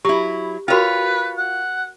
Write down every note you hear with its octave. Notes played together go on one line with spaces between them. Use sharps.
F#3 E4 G4
F4 F#4 A#4 B4 C#5 G5
F#5